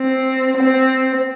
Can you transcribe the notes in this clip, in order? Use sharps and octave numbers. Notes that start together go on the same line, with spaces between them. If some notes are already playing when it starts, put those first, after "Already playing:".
Already playing: C4
C4